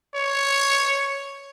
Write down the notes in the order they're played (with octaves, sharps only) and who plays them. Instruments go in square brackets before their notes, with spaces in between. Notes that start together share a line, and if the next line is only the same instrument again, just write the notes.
[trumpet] C#5